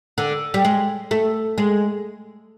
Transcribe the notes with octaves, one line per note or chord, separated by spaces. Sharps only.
D3
G3
G#3
A3
G#3